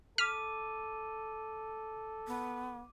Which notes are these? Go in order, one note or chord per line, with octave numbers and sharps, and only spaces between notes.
A4 D6 F6 B6 D#7
B3